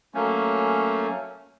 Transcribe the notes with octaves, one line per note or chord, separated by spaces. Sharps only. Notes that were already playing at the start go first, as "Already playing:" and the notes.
F#3 A3 A#3 C#4